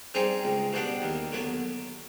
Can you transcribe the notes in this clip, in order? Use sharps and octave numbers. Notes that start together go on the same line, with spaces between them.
G3 C4 D#4 G#4
C#2
B2 G3 B3 D4
D#2
D3 F#3 B3